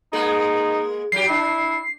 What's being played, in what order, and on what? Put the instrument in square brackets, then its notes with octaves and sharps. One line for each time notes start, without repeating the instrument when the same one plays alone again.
[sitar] G#3 A#3 G#4 [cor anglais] D#4
[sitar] F#3 G4 [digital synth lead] C7
[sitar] D4 [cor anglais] E4